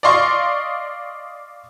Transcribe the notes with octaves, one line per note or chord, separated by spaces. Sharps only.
D5 D#5 F5 C6 C#6